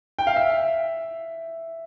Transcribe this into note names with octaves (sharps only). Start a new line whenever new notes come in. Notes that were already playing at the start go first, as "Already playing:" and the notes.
G5
F5
E5